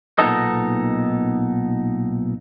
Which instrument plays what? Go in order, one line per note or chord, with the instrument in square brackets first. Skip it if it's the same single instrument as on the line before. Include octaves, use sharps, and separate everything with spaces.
[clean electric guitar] B1 A#2 B3 D#4 A4 D#5